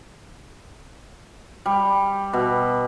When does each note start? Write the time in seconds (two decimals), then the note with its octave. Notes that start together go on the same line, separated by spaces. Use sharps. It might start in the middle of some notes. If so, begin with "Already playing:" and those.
1.66 G3
2.33 B2